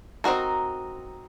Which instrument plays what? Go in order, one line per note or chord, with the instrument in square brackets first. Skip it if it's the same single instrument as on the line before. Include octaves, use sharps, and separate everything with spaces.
[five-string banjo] C4 D#4 F#4 A#4